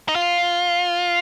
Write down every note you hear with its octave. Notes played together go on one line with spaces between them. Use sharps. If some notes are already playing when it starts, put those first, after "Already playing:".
D#4
F4